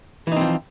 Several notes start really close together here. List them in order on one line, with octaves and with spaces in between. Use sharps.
E3 D#4 C4 F3